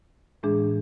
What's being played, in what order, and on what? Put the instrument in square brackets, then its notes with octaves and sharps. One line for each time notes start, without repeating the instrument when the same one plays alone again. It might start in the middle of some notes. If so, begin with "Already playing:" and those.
[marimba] A2 E3 G#3 D4 G#4